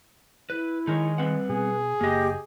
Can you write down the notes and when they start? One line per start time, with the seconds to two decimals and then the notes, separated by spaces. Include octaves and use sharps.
0.50 E4 B4
0.87 D#3 G#3 D#4 A#4 C#5
1.18 G3 C4 B4 F#5
1.49 B2 G#4
2.01 F#1 A#3 G4 D#5